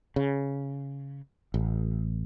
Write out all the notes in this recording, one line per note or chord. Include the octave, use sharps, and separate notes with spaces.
C#3
A1